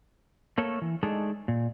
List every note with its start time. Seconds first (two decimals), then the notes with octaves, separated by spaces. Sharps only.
0.58 A3 A#3 A4 A#4 C#5
0.82 E3
1.03 G#3 A3 D4 D#4 G#4 A4
1.48 A#2